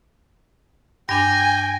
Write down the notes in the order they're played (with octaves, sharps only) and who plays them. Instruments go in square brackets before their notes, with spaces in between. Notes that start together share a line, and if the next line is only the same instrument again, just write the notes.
[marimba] G2 D4 D6 [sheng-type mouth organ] G5 [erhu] G#5 [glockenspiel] A#6